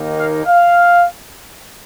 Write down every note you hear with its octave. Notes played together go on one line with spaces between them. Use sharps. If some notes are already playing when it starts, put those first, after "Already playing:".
Already playing: D#2 D#3 A#3 D#4
F5
F5